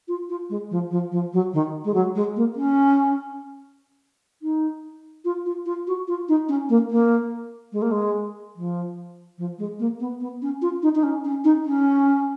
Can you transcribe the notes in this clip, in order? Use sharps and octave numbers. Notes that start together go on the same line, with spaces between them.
F4
F4
G#3
F3
F3
F3
F#3
D#3
G#3
F#3
G#3
A#3
C#4
D#4
F4
F4
F4
F#4
F4
D#4
C#4
A#3
A#3
G#3
A#3
G#3
F3
F3
G#3
A#3
B3
B3
C#4
F4
D#4
D#4
C#4
C#4
D#4
C#4